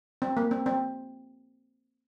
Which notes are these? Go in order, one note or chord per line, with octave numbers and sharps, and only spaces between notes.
C4
A#3
C4
C4